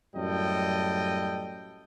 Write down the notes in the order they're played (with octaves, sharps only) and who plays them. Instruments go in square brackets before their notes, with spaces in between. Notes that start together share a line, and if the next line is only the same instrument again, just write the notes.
[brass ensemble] F#2 A2 G3 A4 D#5 G5